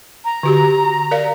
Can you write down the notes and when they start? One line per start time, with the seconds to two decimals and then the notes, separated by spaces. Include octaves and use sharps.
0.25 A#5
0.43 D3 F#4 G4
1.11 A#4 D5 F5